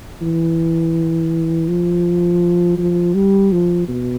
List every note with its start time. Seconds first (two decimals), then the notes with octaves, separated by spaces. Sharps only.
0.22 E3
1.68 F3
2.77 F3
3.14 G3
3.52 F3
3.88 B2